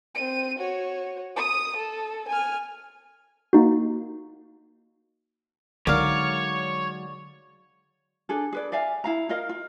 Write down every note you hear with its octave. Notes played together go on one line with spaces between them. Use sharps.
C4 D#7
F#4 C#5
D#6 D#7
A4
G#5 F6
A#3 D#4 F#4
D3 F#3 G#3 D#4 A#4 C#5 D5 F5
D4 G#4 A4
G#4 B4 D5
D5 E5 F5 G#5
E4 F5 A#5
F4 A#4 D#5 F5
F4